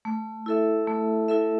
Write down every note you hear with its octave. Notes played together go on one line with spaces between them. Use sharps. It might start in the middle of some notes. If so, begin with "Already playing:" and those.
A3
E4 A4 E5
A3
E4 A4 E5